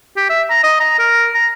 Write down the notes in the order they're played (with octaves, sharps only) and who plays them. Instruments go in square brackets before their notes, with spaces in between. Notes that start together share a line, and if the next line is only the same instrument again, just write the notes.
[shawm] G4
E5
A#5
D#5
A#5
A#4
A#5